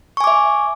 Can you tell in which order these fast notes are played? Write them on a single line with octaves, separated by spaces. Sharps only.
C#6 G#5 D6 E5